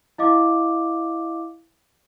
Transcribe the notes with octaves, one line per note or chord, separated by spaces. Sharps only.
E4 D#5 F5 D6